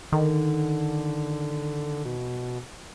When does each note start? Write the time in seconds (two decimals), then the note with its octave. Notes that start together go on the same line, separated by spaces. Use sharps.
0.12 D3 D#3
2.05 B2